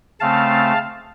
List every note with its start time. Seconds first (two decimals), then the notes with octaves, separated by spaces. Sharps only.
0.20 C#3 A3 C4 F5 A5